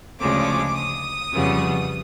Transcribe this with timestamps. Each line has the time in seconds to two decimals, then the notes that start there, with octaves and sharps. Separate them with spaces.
0.19 D2 C#3 F3 G#3 D6
0.76 D#6
1.31 F2 C#3 E3 G3 B3